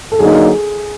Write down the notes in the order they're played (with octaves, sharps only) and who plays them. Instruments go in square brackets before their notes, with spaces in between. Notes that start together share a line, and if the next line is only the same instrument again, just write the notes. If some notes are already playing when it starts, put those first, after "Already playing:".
[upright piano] A4
[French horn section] D3 F#3 A#3 D#4 [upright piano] G#4